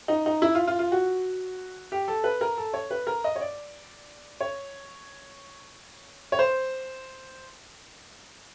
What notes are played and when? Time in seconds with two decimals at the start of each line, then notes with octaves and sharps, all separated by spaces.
0.08 D#4
0.26 D#4
0.42 E4
0.55 F4
0.67 F4
0.79 F4
0.92 F#4
1.92 G4
2.08 A4
2.24 B4
2.41 A#4
2.57 A4
2.74 C#5
2.91 B4
3.07 A#4
3.24 D#5
3.36 C#5
3.41 D5
4.41 C#5
6.32 C#5
6.39 C5